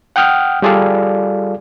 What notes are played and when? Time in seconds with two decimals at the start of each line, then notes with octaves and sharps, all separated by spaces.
0.16 F#5 G5 D#6 F6 G6
0.62 G3 F4 G#4 A4 D5 F5